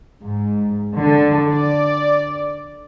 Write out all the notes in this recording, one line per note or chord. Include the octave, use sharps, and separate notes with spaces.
G#2
D3
D5